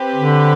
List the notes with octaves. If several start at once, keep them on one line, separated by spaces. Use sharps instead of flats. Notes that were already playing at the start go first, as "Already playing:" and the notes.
Already playing: C4 G4 B4
D3